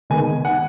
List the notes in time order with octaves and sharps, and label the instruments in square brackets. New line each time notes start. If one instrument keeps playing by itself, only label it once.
[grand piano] D#3 G#3 B3 [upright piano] G#5
[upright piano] F#5